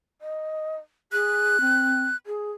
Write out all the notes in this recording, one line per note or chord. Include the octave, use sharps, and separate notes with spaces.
D#5
G#4 F#6
C4
G#4